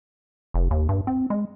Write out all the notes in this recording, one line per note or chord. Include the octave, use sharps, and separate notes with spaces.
F1
D#2
G2
C4
G#3